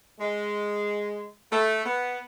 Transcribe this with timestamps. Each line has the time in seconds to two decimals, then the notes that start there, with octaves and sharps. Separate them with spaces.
0.19 G#3
1.51 A3
1.84 B3